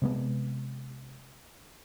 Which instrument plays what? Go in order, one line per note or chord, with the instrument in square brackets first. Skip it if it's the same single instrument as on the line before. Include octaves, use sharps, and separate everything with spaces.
[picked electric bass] C3 G#3 B3